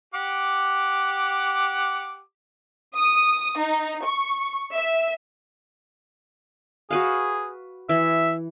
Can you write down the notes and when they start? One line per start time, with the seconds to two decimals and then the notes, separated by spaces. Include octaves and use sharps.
0.14 G4 F#5 D6
2.97 D#6
3.58 D#4
4.05 C#6
4.74 E5
6.90 F#4 G#4 B4 F5
7.89 E3 E5